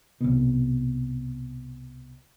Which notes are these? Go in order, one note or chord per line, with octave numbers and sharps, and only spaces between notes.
C2 B2